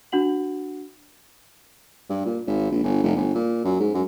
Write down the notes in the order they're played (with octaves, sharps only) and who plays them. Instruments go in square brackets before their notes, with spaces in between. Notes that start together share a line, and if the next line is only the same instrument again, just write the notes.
[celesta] D4 F#4 F#5 F#7
[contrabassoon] G2
A#2
G#1
A#1
G1
F1
G1
A#2
F#2
G#2
F#2